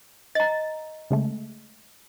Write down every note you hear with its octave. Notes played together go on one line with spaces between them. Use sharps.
D#5 A#5 A6
C#3 G#3 A3